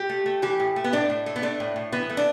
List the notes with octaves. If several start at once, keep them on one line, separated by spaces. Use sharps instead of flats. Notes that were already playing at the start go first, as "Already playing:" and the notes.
Already playing: G4
A3
A3
E3 G4
A2
A3
B3
A2 D4
A2
A3
B3
A3 D4
A2
A2
E3 B3
A3
D4